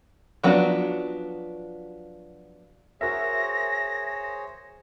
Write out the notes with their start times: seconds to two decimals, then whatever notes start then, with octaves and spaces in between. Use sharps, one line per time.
0.43 F3 F#3 B3 D4 F#4
3.01 F#4 G#4 A#4 C5 C#5 E5 A#6